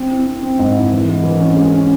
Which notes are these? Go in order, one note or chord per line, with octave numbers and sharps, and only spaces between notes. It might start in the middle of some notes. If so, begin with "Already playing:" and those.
Already playing: C4
E4
C4
C4
G#2
E4
E3
G#3
E3
C#4
G#3
C#4